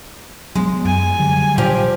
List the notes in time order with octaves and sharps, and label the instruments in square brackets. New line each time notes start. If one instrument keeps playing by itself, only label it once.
[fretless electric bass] F#3 A3 B3 [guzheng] G#3
[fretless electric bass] F#2 [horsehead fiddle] G#5
[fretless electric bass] D3 F#3 G3
[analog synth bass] A#2 [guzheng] F3 [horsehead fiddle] G4